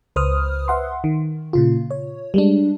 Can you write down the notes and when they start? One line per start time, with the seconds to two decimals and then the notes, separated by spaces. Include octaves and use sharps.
0.16 C#2 B4 C5 D#6 F6
0.68 E5 F#5 C6
1.04 D#3
1.53 A#2 C#3 F4
1.91 C#5
2.34 G3 G#3 D4